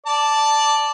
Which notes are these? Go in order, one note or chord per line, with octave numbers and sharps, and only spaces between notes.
D5 A5